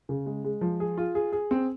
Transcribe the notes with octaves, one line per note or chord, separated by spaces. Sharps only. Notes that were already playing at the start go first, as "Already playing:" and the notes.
C#3
G#3
G#3
F3
G#4
F4
G#4
G#4
C4